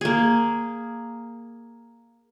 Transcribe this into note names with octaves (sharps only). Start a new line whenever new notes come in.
A#3 G#4